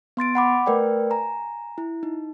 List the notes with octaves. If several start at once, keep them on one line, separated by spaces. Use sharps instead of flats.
B3 C6 A6 D7
F#5 B5 D6
A3 A#4 B4 D5 G5
G#5 A#5
E4
D#4